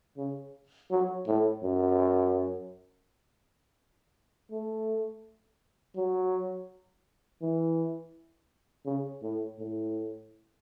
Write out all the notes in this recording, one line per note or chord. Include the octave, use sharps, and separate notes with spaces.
C#3
F#3
A2
F#2
A3
F#3
E3
C#3
A2
A2